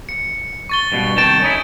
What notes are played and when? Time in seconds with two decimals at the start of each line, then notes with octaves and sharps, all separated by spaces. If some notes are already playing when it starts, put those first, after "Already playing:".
0.09 C#7
0.69 C#6 A6 G7
0.92 G2 B2
1.17 C2 D#3 A5 G6 A6 D7
1.42 C#4 D#4 E4